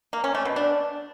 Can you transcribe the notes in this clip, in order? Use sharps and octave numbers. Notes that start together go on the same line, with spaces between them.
A#3
C#4
A3
B2
D4